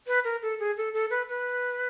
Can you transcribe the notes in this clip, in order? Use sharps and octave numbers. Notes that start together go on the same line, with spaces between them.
B4
A#4
A4
G#4
A4
A4
B4
B4